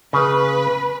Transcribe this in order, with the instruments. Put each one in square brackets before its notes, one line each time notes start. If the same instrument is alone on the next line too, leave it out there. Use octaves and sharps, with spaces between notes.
[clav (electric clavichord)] C#3 [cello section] B4